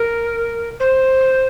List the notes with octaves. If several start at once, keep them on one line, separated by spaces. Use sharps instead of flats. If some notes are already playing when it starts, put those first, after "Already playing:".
Already playing: A#4
C5